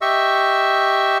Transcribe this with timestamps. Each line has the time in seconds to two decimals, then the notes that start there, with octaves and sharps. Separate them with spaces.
0.01 G4 D#5 E5 C#6 E6